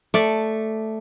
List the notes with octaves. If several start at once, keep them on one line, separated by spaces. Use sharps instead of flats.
A3 D5